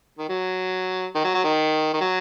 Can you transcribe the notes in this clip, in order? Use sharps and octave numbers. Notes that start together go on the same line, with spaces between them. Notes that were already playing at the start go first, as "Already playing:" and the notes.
D#3
F#3
D#3
F#3
F#3
D#3
D#3
F#3